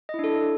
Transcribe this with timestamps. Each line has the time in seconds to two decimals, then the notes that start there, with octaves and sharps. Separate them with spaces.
0.09 D#5
0.14 E4
0.19 D4
0.24 A4